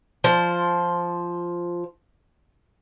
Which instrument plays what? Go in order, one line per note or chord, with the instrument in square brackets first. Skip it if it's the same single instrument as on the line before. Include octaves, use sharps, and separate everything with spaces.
[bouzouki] F3 C5